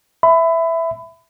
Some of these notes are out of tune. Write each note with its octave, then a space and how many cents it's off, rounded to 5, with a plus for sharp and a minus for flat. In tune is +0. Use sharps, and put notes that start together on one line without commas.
E5 +0 B5 +25